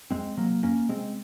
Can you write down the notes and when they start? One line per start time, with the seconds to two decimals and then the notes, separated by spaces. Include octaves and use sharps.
0.11 F2 G#3 C4
0.37 C3 F#3 A#3
0.63 F2 A#3 C#4
0.89 C3 G#3 C4